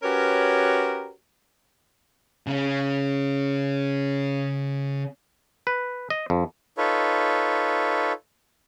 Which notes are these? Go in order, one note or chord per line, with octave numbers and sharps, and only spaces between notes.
C#4 F#4 G4 A#4 B4 C#5
C#3 C#4
B4
D#5
F2
D#4 F4 A4 B4 C#5